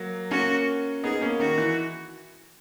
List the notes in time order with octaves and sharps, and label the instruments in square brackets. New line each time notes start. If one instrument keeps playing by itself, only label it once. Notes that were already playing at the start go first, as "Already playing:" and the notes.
Already playing: [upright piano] F#3 A#3
[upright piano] A#3 C#4 [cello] F#4
[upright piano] B3 D#4 [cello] G#4
[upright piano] A#3 C#4
[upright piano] D#3 [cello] F#4
[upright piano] E3